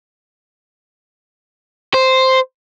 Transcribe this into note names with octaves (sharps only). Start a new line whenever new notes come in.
C5